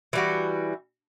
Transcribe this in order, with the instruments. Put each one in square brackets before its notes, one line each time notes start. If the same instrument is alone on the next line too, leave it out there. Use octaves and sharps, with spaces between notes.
[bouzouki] E3 G3 F#4